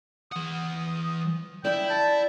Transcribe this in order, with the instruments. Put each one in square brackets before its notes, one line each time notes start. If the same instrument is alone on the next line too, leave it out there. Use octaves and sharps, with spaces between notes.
[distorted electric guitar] E3 F#5 [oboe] D#6
[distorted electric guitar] E4 [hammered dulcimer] D5 D6 [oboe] G5
[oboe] A5